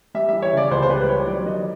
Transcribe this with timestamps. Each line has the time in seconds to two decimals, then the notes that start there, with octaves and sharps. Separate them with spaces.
0.14 G3 E5
0.29 E3 E5
0.42 C#5
0.52 C#3 D5
0.71 C#2 C5
0.83 C5
0.89 G3 B4
1.09 E3 C#5
1.27 F#3 D5
1.46 D#3 D#5